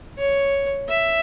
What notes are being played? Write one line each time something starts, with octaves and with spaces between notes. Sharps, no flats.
C#5
E5